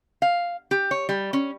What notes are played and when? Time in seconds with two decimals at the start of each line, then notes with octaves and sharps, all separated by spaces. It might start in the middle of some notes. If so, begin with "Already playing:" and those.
0.22 F5
0.71 G4
0.91 C#5
1.09 G3
1.33 C#4